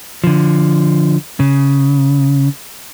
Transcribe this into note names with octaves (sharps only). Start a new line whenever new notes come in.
D3 F3
C#3